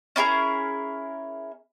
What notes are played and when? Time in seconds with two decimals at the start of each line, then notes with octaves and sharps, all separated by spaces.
0.16 C#4 E4 G#4 A#4